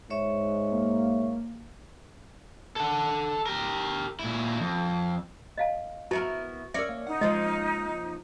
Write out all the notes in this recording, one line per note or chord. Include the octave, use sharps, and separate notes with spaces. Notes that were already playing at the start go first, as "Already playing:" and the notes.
G#2 C#5 E5 C#6
A#3
A4 F#5
G4 A#4
A#2 E4
F2
D#5 F5 A5
B3 E4 F#4 A#4 A5
C#4 A#4 D5 E5 C#7
A#3
D#4 F#5
C#3 F3 G#3 A#3 D#5